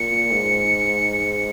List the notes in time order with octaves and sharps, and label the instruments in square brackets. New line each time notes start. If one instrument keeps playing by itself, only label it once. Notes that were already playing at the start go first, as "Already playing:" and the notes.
Already playing: [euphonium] A#2 [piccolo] C#7
[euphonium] G#2